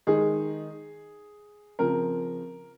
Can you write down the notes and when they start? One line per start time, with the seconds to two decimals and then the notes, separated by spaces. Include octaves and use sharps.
0.07 D#3 G#3 D#4 G#4
1.79 C#3 F3 C4 A#4